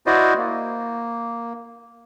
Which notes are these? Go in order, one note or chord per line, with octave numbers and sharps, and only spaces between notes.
E4 F#4 C5 D5 D#5
A#3